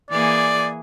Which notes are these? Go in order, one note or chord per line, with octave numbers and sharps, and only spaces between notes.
E3 A#3 G#4 D5